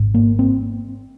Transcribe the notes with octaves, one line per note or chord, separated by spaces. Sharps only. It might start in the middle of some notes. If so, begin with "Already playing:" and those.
Already playing: G#1 G#2
A#3
C4